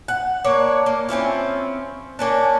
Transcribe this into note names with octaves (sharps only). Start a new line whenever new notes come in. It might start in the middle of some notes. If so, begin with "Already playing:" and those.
F#5
A#3 D4 C#5
A#3
C4 C#4 E4 F4
A#3 C#4 D4